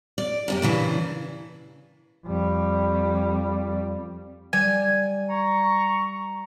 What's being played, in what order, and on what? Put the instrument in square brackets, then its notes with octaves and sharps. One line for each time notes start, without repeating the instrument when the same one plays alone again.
[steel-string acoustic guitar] D5
F#2 C3 G4
A#2 C#3 E3 D4
[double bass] F2 G3
[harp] G3 [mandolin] G#5
[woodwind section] A#5 C#6